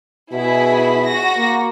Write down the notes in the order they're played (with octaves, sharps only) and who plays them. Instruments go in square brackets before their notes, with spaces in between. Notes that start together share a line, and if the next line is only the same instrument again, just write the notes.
[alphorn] B2 [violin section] E4 G#4 B5
[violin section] F#4 A#6
[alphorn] A#3